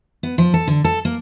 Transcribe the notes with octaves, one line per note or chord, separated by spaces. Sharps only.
B3
F3
A4
D3
A4
A#3